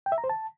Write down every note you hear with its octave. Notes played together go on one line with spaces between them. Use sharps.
G5
E5
A#5
C5
A5